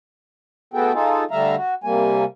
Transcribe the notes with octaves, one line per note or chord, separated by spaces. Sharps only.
A3 B3 F#4 G#4 A4 G5
D#4 F4 G#4 A4
D3 G3 A3 E5 F5 A#5
F#4
C3 G3 A#3 G#5